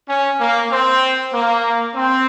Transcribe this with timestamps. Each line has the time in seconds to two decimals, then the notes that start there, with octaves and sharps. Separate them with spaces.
0.09 C#4
0.40 A#3
0.71 C4
1.33 A#3
1.95 C4